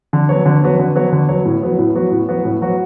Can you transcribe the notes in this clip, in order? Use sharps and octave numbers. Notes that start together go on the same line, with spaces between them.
D3
F#3 B3 F#4 C#5
D3
F#3 B3 F#4 C#5
D3
F#3 B3 F#4 C#5
D3
F#3 B3 F#4 C#5
A2
F#3 B3 F#4
A2
F#3 B3 F#4
A2
F#3 B3 F#4
A2
F#3 B3 F#4